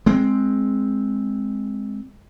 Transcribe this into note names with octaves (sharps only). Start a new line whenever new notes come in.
G#3 C4